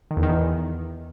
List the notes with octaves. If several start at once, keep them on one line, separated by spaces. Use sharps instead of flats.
D#3
E2
D#3
E2